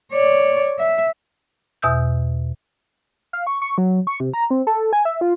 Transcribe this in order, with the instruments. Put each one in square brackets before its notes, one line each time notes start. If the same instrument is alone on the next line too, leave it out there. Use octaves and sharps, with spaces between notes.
[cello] C#5 D5
E5
[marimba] E2 B2 E5 D#6 E6 G6
[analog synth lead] F5
C#6
C#6
F#3
C#6
C3
A#5
C4
A4
G#5
E5
F4